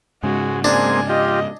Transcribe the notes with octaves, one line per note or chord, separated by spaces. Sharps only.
G#2 C#3 G#3 F#4
G#3 A#3 C4 D4 G#5
F4 G4 D#5